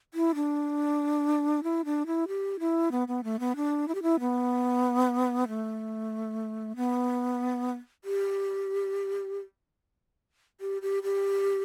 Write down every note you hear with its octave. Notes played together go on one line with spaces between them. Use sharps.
E4
D4
E4
D4
E4
G4
E4
B3
B3
A3
B3
D4
E4
G4
E4
B3
A3
B3
G4
G4
G4
G4